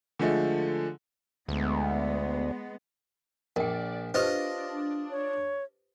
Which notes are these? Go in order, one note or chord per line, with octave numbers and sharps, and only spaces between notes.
D3 F3 G#3 A3
D2 G#3 B3
A#1 A#4 D5 G5
D4 F4 G4 B4 C5 D#5
C#5